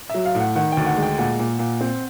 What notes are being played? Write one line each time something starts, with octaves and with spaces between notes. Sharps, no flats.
F#3 E5
F5
A2
F#5
D#3 F#5
D2 G5
F#5
G#3
G5
A#2 F#5
A#2
A#2
C4